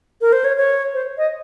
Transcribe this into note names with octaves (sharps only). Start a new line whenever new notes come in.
A#4
C5
C#5
C#5
C5
D#5